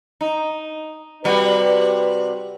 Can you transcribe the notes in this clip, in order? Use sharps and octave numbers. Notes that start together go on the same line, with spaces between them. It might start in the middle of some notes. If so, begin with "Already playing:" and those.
D#4
C3 G3 F#4 B4